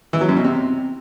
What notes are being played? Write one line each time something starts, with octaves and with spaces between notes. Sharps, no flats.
E3
F#3
F#2
B2
C3